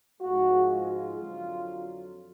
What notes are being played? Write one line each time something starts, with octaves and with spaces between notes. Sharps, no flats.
G#2 F3 G#3 F#4
F4
F2 D3 F#3